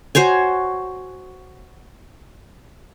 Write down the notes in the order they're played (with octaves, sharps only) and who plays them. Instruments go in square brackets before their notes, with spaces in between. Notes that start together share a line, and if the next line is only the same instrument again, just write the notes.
[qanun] F#4 C5 C#5 G#5